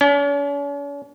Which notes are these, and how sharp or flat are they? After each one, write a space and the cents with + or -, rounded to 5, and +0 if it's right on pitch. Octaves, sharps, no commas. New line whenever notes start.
C#4 +45